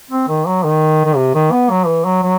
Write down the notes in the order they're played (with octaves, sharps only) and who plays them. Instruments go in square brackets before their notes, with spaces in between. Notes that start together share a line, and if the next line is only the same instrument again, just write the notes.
[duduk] C4
D#3
F#3
D#3
D#3
C3
D#3
B3
F#3
E3
F#3
F#3